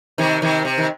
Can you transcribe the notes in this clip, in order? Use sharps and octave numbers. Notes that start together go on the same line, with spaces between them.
C3 D#3
C3 D#3
C3
D#3